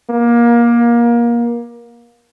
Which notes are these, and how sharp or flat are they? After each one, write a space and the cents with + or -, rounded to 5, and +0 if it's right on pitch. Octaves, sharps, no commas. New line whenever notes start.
A#3 +25